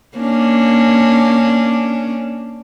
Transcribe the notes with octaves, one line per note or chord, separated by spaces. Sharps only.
A#3 C#4 D4